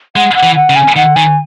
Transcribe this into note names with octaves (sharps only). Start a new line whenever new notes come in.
G#3 F#5
F#5
E3
F#5
C#3
G#5
D#3 F#5
D#3 G#5